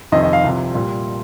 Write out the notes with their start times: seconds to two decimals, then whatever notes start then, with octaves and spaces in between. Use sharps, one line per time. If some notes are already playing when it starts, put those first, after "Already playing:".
0.12 F1 F2 C3 D#3 D#5
0.23 D#5
0.33 F5
0.44 C2 C3 F3
0.74 A#2 G3